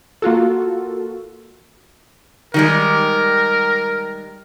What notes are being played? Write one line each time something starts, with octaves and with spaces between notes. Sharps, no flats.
A#3 F4 F#4 A4
D#3 G3 G#3 A#4